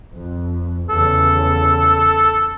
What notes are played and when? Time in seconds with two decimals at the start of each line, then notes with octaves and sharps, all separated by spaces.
0.14 F2
0.90 E2 C#3 A4